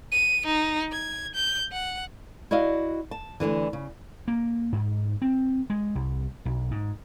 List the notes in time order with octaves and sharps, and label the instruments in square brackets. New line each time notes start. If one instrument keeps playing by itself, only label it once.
[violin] D#7
D#4
G#6
G6
F#5
[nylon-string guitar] E4 F#4 D5 D#5 F5
A5
D2 B2 D3 E3
C#3
[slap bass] A#3
G#2
C4
G#3
C2
B1
G#2